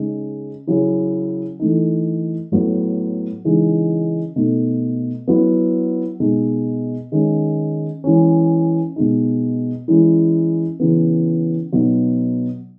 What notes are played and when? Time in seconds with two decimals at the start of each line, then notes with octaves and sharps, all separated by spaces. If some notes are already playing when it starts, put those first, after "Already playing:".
Already playing: C#3 G#3 D#4
0.67 C#3 F#3 C#4 E4
1.59 E3 A3 D#4
2.52 A2 F#3 B3
3.44 C#3 E3 G#3 D#4
4.36 B2 A3 D#4
5.28 F#3 B3 E4
6.20 B2 G#3 D#4
7.12 D#3 G#3 C#4
8.04 E3 G#3 C#4
8.96 B2 G#3 D#4
9.88 E3 G#3 C#4 E4
10.80 C#3 E3 B3
11.72 B2 F#3 B3 D#4